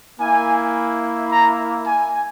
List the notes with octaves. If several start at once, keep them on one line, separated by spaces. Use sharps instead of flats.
A#3 E4 G#5
A#5
G#5